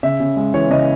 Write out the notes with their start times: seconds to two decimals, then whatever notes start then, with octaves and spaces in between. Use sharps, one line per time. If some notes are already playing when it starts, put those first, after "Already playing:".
0.03 C#3 E5
0.20 C#3
0.36 G#3
0.54 E3 C#5
0.70 C#3 D#5